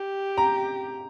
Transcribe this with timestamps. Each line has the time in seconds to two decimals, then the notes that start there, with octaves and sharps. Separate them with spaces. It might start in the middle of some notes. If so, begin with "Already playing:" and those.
Already playing: G4
0.37 A#5